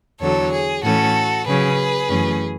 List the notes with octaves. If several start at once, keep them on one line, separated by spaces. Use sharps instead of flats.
E2 D3 F#3 A4 C#5
G#4
A2 E3 A3 C#4 F#4 A4
C#3 F#3 C#4 G#4 B4
F#2 E3 A3 C#4